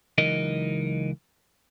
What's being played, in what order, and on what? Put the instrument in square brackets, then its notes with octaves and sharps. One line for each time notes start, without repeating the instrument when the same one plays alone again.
[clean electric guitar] C#2 E3 F#3 D#4 A#4 D#5